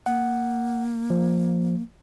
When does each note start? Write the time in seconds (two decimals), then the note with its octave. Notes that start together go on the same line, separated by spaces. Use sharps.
0.06 A#3 F#5
1.10 F3